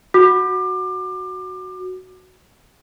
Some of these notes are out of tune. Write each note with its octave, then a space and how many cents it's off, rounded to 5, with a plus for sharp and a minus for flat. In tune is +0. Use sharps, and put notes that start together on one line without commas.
F#4 +0 D6 +30